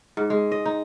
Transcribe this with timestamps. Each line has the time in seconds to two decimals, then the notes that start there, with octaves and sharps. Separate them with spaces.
0.17 G#2
0.30 G#3
0.52 D#5
0.66 D#4